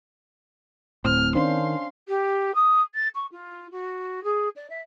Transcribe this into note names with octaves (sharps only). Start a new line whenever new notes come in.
D1 A2 C4 F6
D#3 C#4 D4 C5 F5 C6
G4
D#6
A6
C#6
F4
F#4
G#4
D5
E5